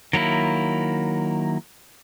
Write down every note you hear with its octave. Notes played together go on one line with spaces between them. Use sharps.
D#3 F#3 A#3 E4